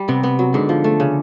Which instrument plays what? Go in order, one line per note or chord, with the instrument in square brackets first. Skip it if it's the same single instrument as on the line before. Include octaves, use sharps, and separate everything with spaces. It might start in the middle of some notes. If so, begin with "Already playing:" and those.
Already playing: [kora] G3
[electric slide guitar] C3 [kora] B3
[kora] B3
F#3
[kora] G#2 [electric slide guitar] D3
[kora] F3
A3
C#3